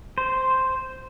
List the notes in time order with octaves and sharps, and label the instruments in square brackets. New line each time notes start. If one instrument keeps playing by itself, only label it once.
[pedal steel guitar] C5